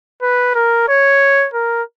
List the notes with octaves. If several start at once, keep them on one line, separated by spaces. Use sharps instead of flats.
B4
A#4
C#5
A#4